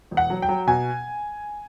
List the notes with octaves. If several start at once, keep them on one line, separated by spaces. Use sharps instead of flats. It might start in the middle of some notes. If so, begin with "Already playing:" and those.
E1
F#5
F#3
G5
F#3
B2 G#5